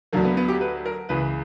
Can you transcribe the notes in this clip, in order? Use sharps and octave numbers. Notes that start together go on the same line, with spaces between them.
D2 D3 F#3 A#3
B3
B3
G4
B4
A#4
C#2 C#3 E3 B4